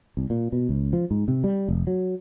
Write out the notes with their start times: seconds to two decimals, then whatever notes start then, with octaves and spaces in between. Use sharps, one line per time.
0.17 C2
0.30 A#2
0.52 B2
0.69 C#2
0.93 F3
1.11 G#2
1.28 C3
1.44 G3
1.69 F1
1.87 F#3